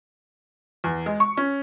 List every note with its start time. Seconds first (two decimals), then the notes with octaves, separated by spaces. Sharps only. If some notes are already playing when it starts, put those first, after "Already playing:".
0.84 E2
1.06 G#3
1.20 C#6
1.37 C#4